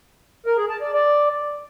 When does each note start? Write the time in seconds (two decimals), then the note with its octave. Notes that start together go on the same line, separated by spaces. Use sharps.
0.46 A#4
0.58 G#4
0.70 A5
0.81 D5
0.93 D5